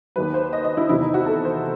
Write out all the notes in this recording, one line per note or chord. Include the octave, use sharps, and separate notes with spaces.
D#2 D#3 F#3 B4
C5
D#5
D#5
E4
E2 C3 D#3 E4
D#4
F#4
A4
C5